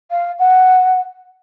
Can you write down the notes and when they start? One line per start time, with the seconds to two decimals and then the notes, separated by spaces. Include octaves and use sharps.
0.11 F5
0.39 F#5